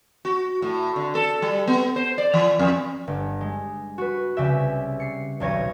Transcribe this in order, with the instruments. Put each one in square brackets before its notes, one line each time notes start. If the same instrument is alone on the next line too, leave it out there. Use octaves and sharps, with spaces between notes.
[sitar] F#4
A2
D3
A4
G3
B3
C5
D5
E3
F2
[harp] G1
G#3
F#4 B4
C2 C#3 G4 E5
C7 C#7
D#1 B1 C#5 A#6 D#7